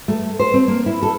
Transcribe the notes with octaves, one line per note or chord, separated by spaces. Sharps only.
A3
C5
C4
A#3
E4
A4